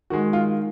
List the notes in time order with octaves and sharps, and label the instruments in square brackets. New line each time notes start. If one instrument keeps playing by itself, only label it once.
[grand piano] D#3 G#3 F#4
F4